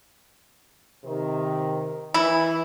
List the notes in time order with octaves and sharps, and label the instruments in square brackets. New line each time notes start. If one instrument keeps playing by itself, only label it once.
[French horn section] C3 D#3
[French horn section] E3 [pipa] E4